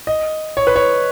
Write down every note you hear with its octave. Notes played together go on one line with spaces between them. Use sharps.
D#5
C#5
B4
C#5